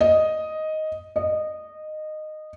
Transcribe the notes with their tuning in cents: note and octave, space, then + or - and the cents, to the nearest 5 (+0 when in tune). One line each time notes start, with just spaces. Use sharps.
D#5 +5
D#5 -15